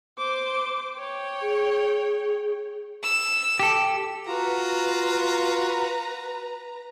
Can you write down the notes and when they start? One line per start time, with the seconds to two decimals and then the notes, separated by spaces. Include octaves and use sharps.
0.18 C5 D6
0.98 C#5 G5
1.42 G#4
3.03 E6
3.60 G4 A4
4.27 F4 F#4 B4 A#5